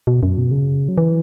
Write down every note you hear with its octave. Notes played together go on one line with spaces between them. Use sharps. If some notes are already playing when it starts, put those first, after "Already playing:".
B2
F#2
B2
C#3
F#3
E3